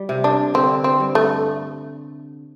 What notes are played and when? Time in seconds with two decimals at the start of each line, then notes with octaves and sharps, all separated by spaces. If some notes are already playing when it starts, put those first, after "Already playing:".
Already playing: G3
0.09 C3
0.24 D4
0.54 D3 C4
0.84 C4
1.00 G2
1.15 A3